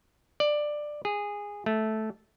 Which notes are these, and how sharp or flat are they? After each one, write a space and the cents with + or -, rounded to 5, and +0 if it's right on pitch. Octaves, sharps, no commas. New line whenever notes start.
D5 +15
G#4 -15
A3 -10